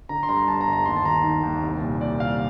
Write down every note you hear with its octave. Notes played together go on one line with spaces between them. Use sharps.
D3 A#5
C6
G2 A#5
G1 A5
A#5
G1
A#5
D#2 C6
A5
D#3 A#5
D#3
D#2
C2
A#2
A#2 D5
C2 F5